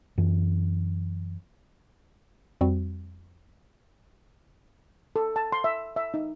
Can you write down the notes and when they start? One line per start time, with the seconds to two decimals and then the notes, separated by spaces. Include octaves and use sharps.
0.18 F#2 E3
2.61 F2 G3 C4 F#4
5.16 A4
5.36 A5
5.52 C6
5.64 E5
5.96 E5
6.14 D#4